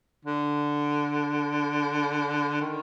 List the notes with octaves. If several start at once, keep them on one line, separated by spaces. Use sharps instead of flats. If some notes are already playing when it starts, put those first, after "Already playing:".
D3
D#3